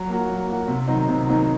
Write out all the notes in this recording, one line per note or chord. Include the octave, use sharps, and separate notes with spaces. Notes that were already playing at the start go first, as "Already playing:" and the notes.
Already playing: F#3
A#3 F#4
F#3
A#3 F#4
C3
D#3 F#3 C4 D#4
C3
D#3 F#3 C4 D#4